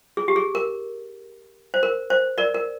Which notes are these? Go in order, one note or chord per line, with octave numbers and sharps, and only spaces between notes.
G#4
G4
G#4
A#4
C5
A#4
C5
A#4 D5
A#4